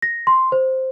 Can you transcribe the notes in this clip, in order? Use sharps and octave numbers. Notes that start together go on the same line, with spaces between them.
A#6
C6
C5